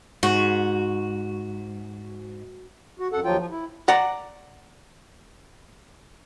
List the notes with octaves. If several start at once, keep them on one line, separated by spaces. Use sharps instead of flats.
G#2 F#4
F#4
F#2 A4 F#5
D#2 F3 F#3 F4 G5
F3
E4
D5 F#5 A#5